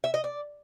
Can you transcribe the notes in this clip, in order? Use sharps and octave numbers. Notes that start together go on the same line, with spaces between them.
E5
D#5
D5